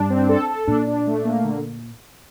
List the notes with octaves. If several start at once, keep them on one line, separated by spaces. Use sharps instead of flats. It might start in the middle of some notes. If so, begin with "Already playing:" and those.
Already playing: G2 D4
C4
A4
A4
A#2 D4
D4
A3
A#3
D3